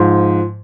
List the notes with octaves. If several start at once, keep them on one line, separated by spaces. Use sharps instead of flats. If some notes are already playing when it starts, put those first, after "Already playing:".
Already playing: G#2 F3